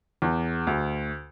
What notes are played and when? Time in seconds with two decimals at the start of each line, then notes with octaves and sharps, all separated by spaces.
0.22 E2
0.67 D2